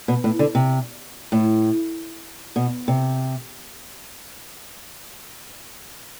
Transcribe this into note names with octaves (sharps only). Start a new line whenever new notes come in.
B2
A2
D3
C3
A2
B2
C3